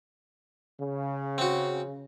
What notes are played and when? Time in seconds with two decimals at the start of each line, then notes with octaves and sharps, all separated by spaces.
0.80 C#3
1.38 C4 F#4